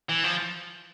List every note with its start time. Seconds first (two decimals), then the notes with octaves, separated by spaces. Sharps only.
0.09 E3
0.24 F3